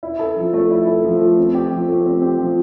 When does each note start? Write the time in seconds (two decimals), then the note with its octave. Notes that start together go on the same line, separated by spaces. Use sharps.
0.03 E4
0.19 A4
0.37 F3
0.54 A3
0.70 E4
0.87 A4
1.04 F3
1.21 A3
1.37 C4
1.55 G4
1.72 F3
1.88 A3
2.06 C4
2.22 G4
2.39 F3